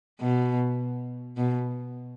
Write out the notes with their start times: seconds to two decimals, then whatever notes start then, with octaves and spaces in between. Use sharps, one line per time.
0.20 B2
1.37 B2